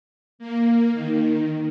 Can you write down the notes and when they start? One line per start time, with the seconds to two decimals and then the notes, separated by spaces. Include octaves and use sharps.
0.39 A#3
0.93 D#3